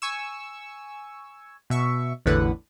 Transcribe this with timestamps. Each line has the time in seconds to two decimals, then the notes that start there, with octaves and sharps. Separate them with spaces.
0.02 G#5 C#6 E6
1.70 B2 E5 C#6
2.26 A1 E2 A2 D3 B4 F#5